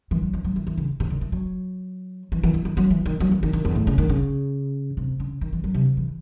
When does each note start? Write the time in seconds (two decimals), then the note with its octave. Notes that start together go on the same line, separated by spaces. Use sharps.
0.11 E3
0.22 F#3
0.33 E3
0.45 F#3
0.56 E3
0.67 E3
0.77 C#3
1.00 C3
1.05 C#3
1.10 D#3
1.21 E3
1.32 F#3
2.32 E3
2.43 E3
2.54 E3
2.65 E3
2.77 F#3
2.91 E3
3.06 D#3
3.20 F#3
3.31 E3
3.43 D#3
3.53 D#3
3.65 E2
3.75 A2
3.87 C#3
3.98 D#3
4.09 C#3
4.97 C3
5.20 C#3
5.41 D#3
5.53 E3
5.64 F#3
5.74 C3
5.97 E3